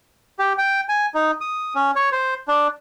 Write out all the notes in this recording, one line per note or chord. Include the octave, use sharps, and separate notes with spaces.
G4
G5
G#5
D#4
D#6
C#4
C#5
C5
D4